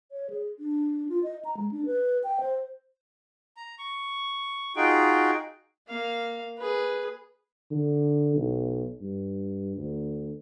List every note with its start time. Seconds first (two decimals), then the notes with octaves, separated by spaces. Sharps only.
0.11 C#5
0.30 G#4
0.59 D4
1.09 F4
1.23 D#5
1.45 A#5
1.57 G#3
1.71 D4
1.86 B4
2.24 G5
2.40 C5
3.57 A#5
3.79 C#6
4.76 D#4 F4 F#4 G#4 G5
5.88 A#3 F5
6.57 G#4 B4
7.71 D3
8.36 B1
9.01 G2
9.77 D2